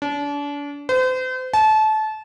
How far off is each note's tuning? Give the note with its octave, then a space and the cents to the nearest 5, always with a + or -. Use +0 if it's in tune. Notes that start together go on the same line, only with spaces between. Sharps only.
D4 -35
C5 -40
A5 -25